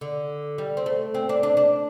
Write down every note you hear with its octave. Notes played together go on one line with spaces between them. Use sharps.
D3
G3
C4
A3
C4
D4
D4
D4